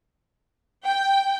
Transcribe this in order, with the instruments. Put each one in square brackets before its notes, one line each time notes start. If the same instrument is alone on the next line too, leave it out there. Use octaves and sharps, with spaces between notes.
[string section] G5